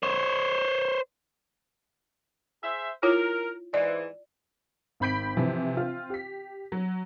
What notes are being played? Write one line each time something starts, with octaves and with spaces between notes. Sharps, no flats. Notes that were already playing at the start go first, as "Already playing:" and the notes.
C5 C#5
G#4 C5 E5
E4 F4 A#4 C#5
G#2 E3 D5
G#1 C4 B5 G6 B6 D7
C3 E3 F3
C4 F4
G4 B6
F#3